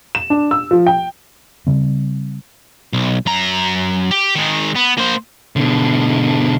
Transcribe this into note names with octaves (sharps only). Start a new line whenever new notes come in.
E7
D4
E6
F3
G5
C#3 G3 C4
B1
F#2 A#5
G4
D#3 G#3
B3
A#3 C5
B2 D3